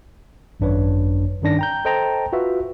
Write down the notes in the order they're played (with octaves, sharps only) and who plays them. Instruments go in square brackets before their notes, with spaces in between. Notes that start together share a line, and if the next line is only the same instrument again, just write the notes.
[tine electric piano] G#1 F#2 D4 B4 C#5
G2 D#3 C#4 D4 A#6
G5 A#5 G6
A4 C5 D#5 G5 A5 A#5
F4 F#4 B4 E5